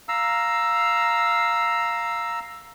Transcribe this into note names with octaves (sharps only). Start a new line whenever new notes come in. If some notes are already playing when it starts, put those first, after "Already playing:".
F5 A#5 E6